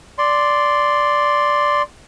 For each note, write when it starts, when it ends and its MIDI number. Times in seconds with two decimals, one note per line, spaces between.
0.18 1.82 74
0.18 1.82 84